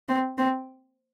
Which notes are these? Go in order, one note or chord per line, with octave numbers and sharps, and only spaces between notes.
C4
C4